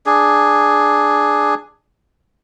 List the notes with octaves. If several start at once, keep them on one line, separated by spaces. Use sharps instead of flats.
D4 G#4